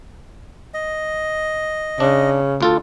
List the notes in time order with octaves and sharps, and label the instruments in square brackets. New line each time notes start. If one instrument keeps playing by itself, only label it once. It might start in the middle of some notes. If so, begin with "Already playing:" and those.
[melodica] D#5
[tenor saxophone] C#3 [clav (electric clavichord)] D4
[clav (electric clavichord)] D2 F4 A4